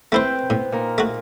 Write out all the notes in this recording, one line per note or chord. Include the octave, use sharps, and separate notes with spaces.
A3 C4 E4 B4 C5 G5
A2 B3
A#2 D#4 A#4
A3 F#4